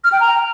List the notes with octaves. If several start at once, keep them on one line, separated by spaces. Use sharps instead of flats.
F6
G5
A#5